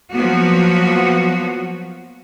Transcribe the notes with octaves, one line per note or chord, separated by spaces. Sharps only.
F3 F#3 A#3 B3 F#4